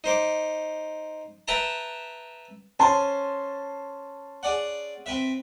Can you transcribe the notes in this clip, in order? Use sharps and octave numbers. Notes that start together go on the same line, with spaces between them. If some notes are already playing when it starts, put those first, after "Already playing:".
D#4 C5 D6
B4 E5 G5 A5 A#5
C#4 C5 G#5 A5 C6
G#4 D5 F#5
C4 B4 E5